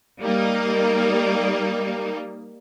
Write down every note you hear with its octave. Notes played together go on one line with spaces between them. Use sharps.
G3 A#3 D#4